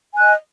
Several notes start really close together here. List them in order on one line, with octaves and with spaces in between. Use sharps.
G#5 F#6 D#5